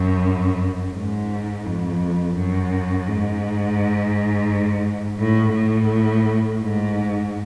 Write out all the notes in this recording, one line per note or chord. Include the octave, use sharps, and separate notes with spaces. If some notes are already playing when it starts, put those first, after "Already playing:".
Already playing: F#2
G#2
F2
F#2
G#2
A2
A2
G#2